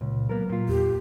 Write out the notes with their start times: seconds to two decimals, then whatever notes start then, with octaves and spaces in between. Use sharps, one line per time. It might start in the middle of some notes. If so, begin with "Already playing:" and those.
0.01 C#2 A#2
0.29 F#3 A#3 B3 A#4
0.49 A#2 F4
0.69 E2 G4